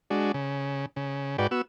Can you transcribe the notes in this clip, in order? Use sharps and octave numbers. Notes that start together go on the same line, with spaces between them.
G#3 D4 F#4
C#3
C#3
G#2 F#4 B4 D5 G5
B3 F#4 E6